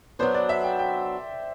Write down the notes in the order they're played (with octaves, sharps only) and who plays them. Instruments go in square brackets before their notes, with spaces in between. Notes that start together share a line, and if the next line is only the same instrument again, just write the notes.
[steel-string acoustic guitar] F#3 B3 D4 [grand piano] C5
[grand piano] D5
E5
G5
G5